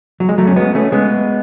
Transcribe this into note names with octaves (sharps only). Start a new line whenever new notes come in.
F#3
G#3
F#3 A3
C#4
G#3 B3
A3 C#4
G#3 B3